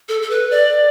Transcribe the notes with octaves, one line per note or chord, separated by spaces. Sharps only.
A4
A4
B4
D5